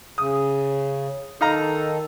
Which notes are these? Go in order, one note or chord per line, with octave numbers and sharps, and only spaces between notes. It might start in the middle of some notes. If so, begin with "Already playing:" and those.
C#3 D#6
D#3 D#4 A4 F5 A#5